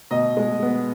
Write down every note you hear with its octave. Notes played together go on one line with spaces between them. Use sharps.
B2 D#5
G#3
B3